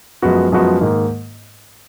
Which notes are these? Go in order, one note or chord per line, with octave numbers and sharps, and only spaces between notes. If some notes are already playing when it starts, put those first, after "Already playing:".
F#2 F3 G#3 B3 F#4
F#2 F3 G#3 B3 F#4
G#2 D#3 A#3